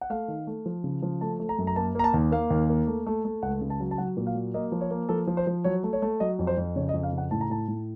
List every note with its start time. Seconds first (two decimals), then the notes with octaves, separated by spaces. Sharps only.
0.01 F#5
0.10 A3 F5
0.28 D#3
0.47 A3
0.66 F3
0.84 C#3
1.02 F3
1.21 A3 A5
1.40 A3
1.49 A#5
1.58 F#2
1.67 A#5
1.76 A#3 A5
1.95 A#3 A#5
2.04 A5
2.14 D#2
2.32 A#3 F5
2.50 D#2
2.69 A#3
2.87 A3
3.06 A3
3.25 A3
3.42 C#2 F#5
3.61 C#3
3.70 A5
3.80 F#3
3.91 A5
3.98 F#3 F#5
4.17 A#2
4.27 F5
4.35 F#3
4.54 A#3 D#5
4.72 F3
4.81 C#5
4.91 A#3
5.09 F3 A4
5.27 F3
5.37 C5
5.47 F3
5.64 F#3 C#5
5.83 A3
5.93 C#5
6.02 A3
6.20 F#3 D#5
6.39 F2
6.47 C5
6.58 F2
6.76 C#3 C#5
6.89 D#5
6.94 F2
7.03 F5
7.13 C#3
7.18 F#5
7.31 A2 A5
7.41 A#5
7.50 A2 A5
7.68 A2